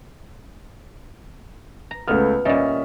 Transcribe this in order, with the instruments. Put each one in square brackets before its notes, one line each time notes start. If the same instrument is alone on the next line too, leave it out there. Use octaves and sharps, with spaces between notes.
[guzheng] A#5
[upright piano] C#2 A3 F6 [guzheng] B3
[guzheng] A#2 G3 [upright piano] C#4 D#5 E5